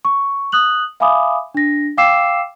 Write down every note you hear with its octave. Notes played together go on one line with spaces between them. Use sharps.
C#6
D#6 F#6 F#7
E5 F5 G#5 B5 D6 D#6
D4 A#6
F5 G5 D6 E6 C7 E7